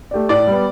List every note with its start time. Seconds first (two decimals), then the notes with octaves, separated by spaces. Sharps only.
0.11 A3 G4 D5
0.29 A2 D5
0.47 G3 B3